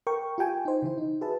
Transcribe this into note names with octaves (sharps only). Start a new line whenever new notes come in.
A#4 G5 C#6
F4 G4 G5 G#5
D#4 C5
C#3 E3 E4
D#4
F#4 G#4 B4 E5 A5